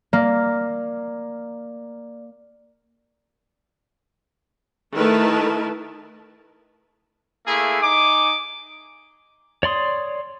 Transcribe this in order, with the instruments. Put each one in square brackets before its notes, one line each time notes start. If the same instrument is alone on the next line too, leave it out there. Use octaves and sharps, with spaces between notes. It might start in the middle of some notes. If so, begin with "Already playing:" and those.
[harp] A#3 [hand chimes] D5
[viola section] D#3 A3 E4 A#4 B4 A5
[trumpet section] A3 A#3 E4 G#4
D#4 G#5 D6
[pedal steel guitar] C#5 D5 C6 D#6